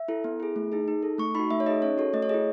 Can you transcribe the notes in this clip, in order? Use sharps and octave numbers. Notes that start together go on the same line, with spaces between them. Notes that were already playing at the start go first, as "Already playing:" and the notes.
Already playing: E5
E4 A4
B3
E4 G#4
A3
D#4 G#4
D#4
A4
A3 C#6
D#4 F#4 B5
A3 E5
C#5
D#4 G#4 D#5
C#4 C#5
F#4 A4 C#5
A3 D#5
C#5
E4 G#4 D#5